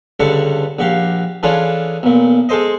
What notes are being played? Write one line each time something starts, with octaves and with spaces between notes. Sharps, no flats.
C#2 G2 D3 A4 A5 C#6
A#1 F#4 G4 F5
E3 C#4 D4 F4 G#4 A4
B1 A#2
G#3 A4 C5 D#5